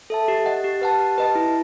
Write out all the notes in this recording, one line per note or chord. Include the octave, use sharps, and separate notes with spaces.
A4 E5 A5
G4
D#5 F#5
G4
B4 F#5 A5
G4
B4 D#5 A5
E4